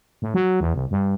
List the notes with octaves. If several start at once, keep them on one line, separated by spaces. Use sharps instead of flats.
A2
F#3
E2
C2
G2